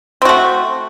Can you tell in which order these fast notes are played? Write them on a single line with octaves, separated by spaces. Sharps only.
C4 F#4 A3